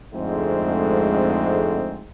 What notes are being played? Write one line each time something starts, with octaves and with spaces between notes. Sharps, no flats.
F2 G#2 D3 G#3 A3 C4